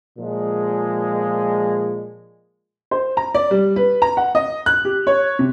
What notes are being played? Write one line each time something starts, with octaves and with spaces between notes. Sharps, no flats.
A#2 F3 G#3
C5
A#5
D5
G3
B4
A#5
F#5
D#5
F#6
G4
C#5
C3